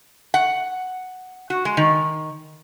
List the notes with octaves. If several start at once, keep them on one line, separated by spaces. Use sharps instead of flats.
F#5
F#4
G#3
D#3